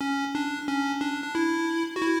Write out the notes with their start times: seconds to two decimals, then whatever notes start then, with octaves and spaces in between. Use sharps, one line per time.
0.01 C#4
0.35 D4
0.68 C#4
1.01 D4
1.23 D4
1.35 E4
1.96 F#4
2.02 E4